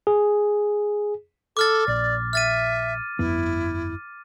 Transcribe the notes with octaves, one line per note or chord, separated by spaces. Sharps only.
G#4
A4 D6 F6 A6
A#1 D5
E5 F6 A6 D#7
G1 F2 B3 E4